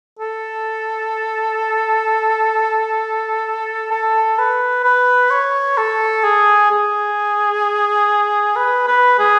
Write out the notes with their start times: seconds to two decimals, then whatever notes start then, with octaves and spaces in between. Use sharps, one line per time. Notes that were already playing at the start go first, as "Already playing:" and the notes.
0.19 A4
3.91 A4
4.38 B4
4.84 B4
5.30 C#5
5.77 A4
6.24 G#4
6.71 G#4
8.56 B4
8.87 B4
9.19 G#4